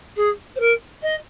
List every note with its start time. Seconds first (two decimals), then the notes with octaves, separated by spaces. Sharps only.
0.16 G#4
0.55 C5
0.59 A#4
1.02 D#5